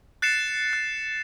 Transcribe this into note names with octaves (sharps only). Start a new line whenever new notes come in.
F#6 A6 C7 C#7 E7
F#6